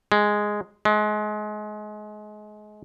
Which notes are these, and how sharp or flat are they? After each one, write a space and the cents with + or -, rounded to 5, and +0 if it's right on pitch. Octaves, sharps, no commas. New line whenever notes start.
G#3 +0
G#3 +30